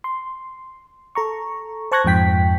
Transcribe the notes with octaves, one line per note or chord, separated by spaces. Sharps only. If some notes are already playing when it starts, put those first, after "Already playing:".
C6
A4 A#5 C#6
C5 A5 C#6 F#6 G#6 A#6
F2 G#2 F3 G5 B6